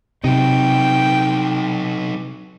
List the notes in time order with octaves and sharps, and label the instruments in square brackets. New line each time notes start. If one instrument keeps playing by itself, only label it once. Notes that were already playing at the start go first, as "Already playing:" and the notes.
[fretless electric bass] C3 [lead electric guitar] F#3 D#4 [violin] G5